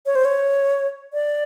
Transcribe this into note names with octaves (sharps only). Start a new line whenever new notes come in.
C#5
C5
C#5
D5